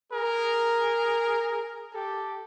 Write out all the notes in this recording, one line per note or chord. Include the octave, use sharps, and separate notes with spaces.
G#4 A#4
G4 A4